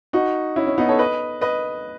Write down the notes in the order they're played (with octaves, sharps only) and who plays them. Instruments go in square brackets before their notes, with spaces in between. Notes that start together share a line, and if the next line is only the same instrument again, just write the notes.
[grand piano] D#4 F#4
C#4 E4
C#4
B3 D#4
A4 C#5
B4 D#5
B4 D#5